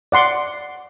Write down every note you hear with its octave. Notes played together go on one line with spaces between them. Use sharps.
D5 F#5 C6 D6